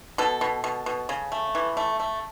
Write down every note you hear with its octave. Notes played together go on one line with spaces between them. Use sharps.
B2 A4
B2
B2
B2
C#3
A3
E3
A3
A3